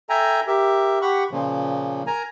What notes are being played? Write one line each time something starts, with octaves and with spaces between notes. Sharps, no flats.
A4 E5 G5 G#5 A#5
G4 A#4 E5
G4 F#5 B5 C#6
A#2 C#3 F3
A#4 G#5 A#5